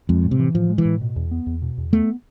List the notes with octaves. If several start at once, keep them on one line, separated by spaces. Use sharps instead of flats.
F2 G#3
A2
C3
E3
A2 F3
G#3
E3
A2
B2
E2
B3
E2
B2
E2
A3 B3